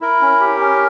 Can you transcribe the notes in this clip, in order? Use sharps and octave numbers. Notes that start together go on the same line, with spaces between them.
E4 A#4
C#4
G4
C#4